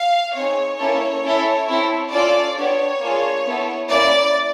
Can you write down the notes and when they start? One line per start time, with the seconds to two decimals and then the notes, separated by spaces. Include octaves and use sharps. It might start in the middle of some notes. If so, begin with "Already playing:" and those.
Already playing: F5
0.34 C4 D#4 G#4 C#5
0.79 A#3 C#4 E4 A4 C#5
1.24 C#4 E4 A4
1.68 C4 E4 A4
2.12 C#4 F4 A4 D5
2.57 B3 D4 G4 C#5
3.01 A#3 D4 F4 G#4
3.46 B3 E4 A4
3.90 A#3 C#4 E4 D5